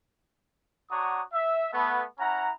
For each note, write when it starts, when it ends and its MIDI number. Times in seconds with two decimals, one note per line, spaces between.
0.91 1.22 62
0.91 1.22 66
0.91 1.22 73
0.91 1.22 78
0.91 1.22 82
0.91 1.22 87
1.33 1.72 76
1.73 2.04 57
1.73 2.04 59
2.19 2.51 61
2.19 2.51 64
2.19 2.51 78
2.19 2.51 82